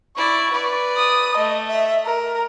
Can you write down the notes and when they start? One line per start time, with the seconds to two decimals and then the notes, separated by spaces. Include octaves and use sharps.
0.16 E4 D5 C#6
0.52 B4 D5
0.97 D#6
1.37 A3 D#5
1.68 E5
2.05 A#4